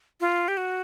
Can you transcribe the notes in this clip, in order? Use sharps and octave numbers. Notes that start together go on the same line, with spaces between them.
F4
G4
F#4